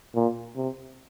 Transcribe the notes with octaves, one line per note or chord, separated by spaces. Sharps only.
A#2
C3